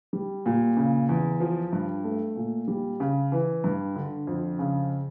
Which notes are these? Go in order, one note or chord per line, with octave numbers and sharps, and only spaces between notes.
G3
A#2
C#3
E2
F3
G2
A3
A#2
G3
C#3
E3
G2
D3
F2
C#3